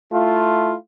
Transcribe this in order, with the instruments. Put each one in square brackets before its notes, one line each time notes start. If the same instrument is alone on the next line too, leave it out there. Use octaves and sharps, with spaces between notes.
[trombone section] A3 E4 F4